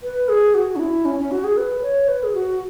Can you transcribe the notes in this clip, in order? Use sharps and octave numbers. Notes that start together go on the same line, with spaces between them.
B4
G#4
F#4
C#4
E4
C#4
C#4
F#4
G#4
B4
C#5
B4
G#4
F#4